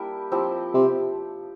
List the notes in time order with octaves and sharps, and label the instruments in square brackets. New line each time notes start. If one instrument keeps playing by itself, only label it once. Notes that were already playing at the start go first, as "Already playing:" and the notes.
Already playing: [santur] G3 A#3 D4 E4 G4 A#4
F3 C4 E4 G4
[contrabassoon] C3